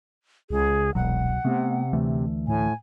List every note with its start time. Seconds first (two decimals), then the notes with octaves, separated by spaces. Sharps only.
0.50 C#2 G#4
0.95 E1 C2 B2 F#3 F#5
1.45 C3 A3 B3 C4
1.93 D2 E3 A3
2.48 A2 G#5